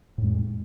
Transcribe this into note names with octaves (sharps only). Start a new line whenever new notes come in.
F2 A2 G#3